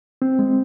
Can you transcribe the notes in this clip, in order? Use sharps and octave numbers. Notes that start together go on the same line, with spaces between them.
C4
G#3